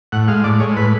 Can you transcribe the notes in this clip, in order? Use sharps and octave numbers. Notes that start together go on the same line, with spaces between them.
A2 F#5
G#3 F5
A2 D5
G#3 C#5
A2 B4